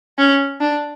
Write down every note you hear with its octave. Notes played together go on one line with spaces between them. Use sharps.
C#4
D4